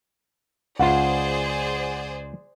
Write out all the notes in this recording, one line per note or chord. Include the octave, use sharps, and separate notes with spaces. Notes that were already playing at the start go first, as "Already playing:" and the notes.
C#2 F4 G#4 C5 D5 F#5